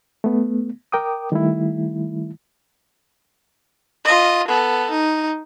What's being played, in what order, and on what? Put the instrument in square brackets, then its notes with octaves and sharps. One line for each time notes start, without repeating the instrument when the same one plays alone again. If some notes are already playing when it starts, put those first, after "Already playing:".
[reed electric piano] A3 B3
A#4 G5 D6 D#6
D#3 G3 A3 E4
[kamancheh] F4 D#5
B3 A4
D#4